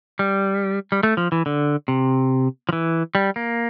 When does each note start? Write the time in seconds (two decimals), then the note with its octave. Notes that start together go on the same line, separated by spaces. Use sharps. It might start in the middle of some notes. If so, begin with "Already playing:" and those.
0.19 G3
0.92 G3
1.03 A3
1.17 F3
1.32 E3
1.46 D3
1.88 C3
2.69 F3
2.73 E3
3.15 G3
3.36 A#3